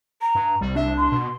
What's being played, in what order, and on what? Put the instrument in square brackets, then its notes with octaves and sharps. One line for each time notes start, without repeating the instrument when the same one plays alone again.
[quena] A#5
[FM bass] G2
[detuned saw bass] C2 [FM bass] G3
[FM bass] D4 [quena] E5
[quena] C6
[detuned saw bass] B2